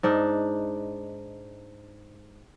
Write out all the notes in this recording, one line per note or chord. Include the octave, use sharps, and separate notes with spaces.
G#2 D4 D#4